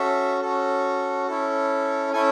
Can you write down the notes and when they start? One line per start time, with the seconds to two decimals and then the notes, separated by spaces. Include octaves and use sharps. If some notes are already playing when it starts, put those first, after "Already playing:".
Already playing: C#4 F#4 A4 E5
0.42 C#4 F#4 A4
1.27 C#4 E4 A4
2.13 C#4 E4 A4 G#5